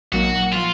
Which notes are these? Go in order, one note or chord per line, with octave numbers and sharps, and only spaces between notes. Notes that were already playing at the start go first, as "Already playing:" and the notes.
A#1 A#2 F#3 A#3 D#4 F#4
F3 F4